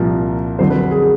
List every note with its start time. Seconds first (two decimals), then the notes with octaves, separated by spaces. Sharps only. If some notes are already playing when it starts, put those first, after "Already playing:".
Already playing: C2 A#2 F3 A#4
0.59 F2 D3 F#3 C5
0.70 B4
0.80 A#4
0.91 G#4
1.01 G#4